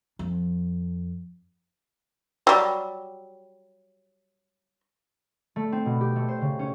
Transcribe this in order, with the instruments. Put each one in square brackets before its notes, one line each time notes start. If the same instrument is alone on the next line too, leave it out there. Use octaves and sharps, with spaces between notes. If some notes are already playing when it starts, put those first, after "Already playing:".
[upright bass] F2
[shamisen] F#3 G3
[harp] A3
C4
B2
G4
A3
C5
C#3
C#4